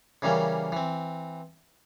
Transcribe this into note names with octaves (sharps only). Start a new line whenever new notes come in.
C#3 E3 G3 A#3 C#4
E3 C4